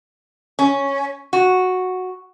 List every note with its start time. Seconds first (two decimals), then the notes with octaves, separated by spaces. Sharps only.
0.59 C#4
1.33 F#4